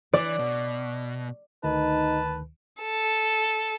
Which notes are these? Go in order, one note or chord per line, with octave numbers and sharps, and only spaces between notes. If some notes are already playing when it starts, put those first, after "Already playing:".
E3 D5
B2
D2 D#3 D#4 B4 A5
A4